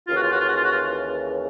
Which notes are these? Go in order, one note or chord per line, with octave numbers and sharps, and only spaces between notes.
D#2 C#3 E3 F4
F#4
F4
F#4
F4
F#4
F4
F#4
F4